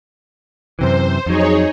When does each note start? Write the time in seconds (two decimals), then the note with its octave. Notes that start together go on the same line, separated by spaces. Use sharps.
0.79 F#2 C3 E3 C5
1.26 F2 F#3 D#4 G#4 C#5